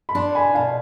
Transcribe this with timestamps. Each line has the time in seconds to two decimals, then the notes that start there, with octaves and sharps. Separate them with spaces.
0.09 B5
0.15 D4 A5 C6
0.35 G#5 B5
0.55 B2 F5 A5